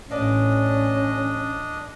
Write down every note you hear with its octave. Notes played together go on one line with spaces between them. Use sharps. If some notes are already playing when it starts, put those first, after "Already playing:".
A1 C#4 D4 B4 D5 D#5 F5